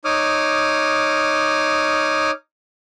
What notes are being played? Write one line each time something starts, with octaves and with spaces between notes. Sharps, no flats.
D#4 C#5 D6 D#6 F6